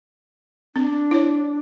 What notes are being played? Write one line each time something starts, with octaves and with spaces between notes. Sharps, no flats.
C4 D4
E4 C#5